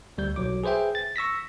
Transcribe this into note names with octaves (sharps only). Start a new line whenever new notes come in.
D2 G3 G6
B1 F#3 D6
G#4 B4 C5 E5 G5
A6
C#6 E6 A#6 B6